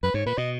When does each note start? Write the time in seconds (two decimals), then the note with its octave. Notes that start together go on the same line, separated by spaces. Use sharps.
0.03 F#2 B4
0.14 G#2 C#5
0.26 A#2 B4
0.38 B2 D#5